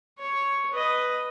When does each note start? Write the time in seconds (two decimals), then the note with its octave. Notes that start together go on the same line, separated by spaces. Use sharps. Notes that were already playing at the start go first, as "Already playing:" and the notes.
0.19 C#5
0.73 B4 D#5